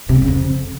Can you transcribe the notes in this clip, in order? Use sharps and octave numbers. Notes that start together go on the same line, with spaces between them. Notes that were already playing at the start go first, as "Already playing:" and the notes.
C3
G#2
C#3
F2